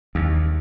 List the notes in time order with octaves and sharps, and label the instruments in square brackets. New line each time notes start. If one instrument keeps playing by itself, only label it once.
[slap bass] D#2